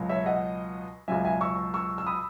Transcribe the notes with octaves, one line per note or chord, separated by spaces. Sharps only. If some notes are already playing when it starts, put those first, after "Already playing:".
Already playing: C#2 B2 F#3
C#5 E5
D#5 F#5
C#2 B2 F#3 E5 G#5
E5 G#5
C#6 E6
C#6 E6
E6
B5 D#6